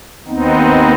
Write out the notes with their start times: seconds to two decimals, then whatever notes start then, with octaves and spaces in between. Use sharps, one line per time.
0.27 D#2 B3 C4 D#4